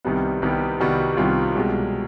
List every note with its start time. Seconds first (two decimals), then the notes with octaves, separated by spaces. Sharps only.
0.05 C2 C3 D#3 G3 B3
0.42 C2 C3 D#3 G3 B3 G4
0.80 C2 C3 D#3 G3 B3 F#4
1.17 C2 C3 D#3 G3 B3 F4
1.55 C2 B2 G#3 G4